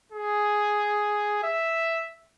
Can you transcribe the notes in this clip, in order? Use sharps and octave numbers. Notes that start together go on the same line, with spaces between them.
G#4
E5